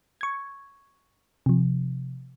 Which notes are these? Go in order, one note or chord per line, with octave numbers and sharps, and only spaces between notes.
C#6 G#6
C3 F3